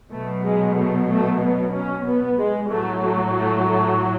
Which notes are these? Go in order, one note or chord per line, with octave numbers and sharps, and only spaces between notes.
B2 F#3 A3
G#3
A3
A3
B3
C#4
B3
G#3
A2 F#3 A3
A3
A3
A3